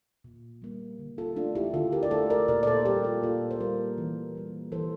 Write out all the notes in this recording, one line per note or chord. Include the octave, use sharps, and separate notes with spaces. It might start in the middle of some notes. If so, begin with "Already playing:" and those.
A#2
G3 A#3
D3
F4 A4
A3 D4 F4
E4 G4
D3 F4 A4
G4 A#4
D5
A3 A4 C5
A#4 D5
A#2 A#4 D5
D5
A4 C5
G3 A#3 G4 A#4
F4 A4
A#2 F4 A4
C5
G3 A#3 G4 A#4
E3
G3 A#3
E3 A4 C5